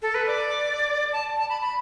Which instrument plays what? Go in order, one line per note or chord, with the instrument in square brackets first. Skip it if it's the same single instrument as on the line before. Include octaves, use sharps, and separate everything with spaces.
[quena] A4
B4
D5
A5
A5
B5
B5